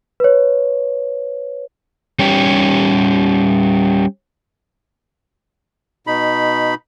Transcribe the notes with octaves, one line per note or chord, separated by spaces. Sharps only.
B4 C#5
G3 C#4 G4
B2 D#4 B5